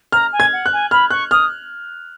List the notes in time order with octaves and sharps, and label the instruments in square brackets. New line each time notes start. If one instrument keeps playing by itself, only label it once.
[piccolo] A#5 [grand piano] F6
[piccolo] G#5
[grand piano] G#6
[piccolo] F#5
[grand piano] F#6
[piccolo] G#5
[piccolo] B5 [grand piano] F6
[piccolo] C#6 [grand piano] F#6
[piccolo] D#6 [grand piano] F6